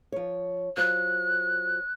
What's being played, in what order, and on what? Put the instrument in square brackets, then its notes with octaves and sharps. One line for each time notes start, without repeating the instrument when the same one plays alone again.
[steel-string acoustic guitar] F3 C#5
[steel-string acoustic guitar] F#3 F4 C5 [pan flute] F#6